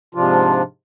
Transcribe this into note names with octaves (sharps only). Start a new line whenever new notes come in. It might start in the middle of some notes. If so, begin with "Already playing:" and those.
G#2 C3 F3 D4 F4